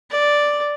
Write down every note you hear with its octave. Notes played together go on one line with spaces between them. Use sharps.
D5